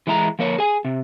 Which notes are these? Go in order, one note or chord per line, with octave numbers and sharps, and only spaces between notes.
E3 G#3 E4 A5 A#5
F3 A#3 C#5
G#4 G#5
C3